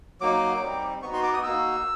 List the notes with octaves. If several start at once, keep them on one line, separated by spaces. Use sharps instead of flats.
F#3 A#3 D#4 D6
G3 C4 D#4
B3 D#4 F#4 C#6
C6
D6
D#6
A#3 D#4 F#4 E6